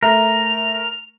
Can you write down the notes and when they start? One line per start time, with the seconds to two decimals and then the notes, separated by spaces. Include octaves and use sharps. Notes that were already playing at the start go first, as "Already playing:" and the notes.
0.03 A3 A#4 F7